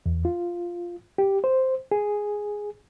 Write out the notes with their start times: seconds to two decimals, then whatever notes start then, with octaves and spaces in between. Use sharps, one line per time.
0.06 E2
0.25 F4
1.18 G4
1.44 C5
1.92 G#4